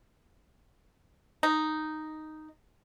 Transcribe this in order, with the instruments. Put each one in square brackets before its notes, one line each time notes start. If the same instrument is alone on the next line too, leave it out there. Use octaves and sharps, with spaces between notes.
[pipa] D#4